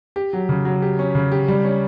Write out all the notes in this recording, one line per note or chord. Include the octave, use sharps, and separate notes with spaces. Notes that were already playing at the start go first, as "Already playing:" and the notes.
G4
F#3
C#3
F#3
G4
C#4
C#3
G4
G3
C#4